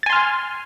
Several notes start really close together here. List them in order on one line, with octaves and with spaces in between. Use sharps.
A6 G#5 C6 F6